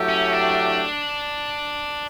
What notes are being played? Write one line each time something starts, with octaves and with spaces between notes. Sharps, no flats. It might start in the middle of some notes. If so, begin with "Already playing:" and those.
Already playing: F#3 A3 E4 G4
C#4
D4